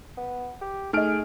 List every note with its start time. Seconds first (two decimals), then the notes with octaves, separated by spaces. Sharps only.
0.17 B3
0.61 G4
0.93 A3 D#4 G#4 D#5 F6 D7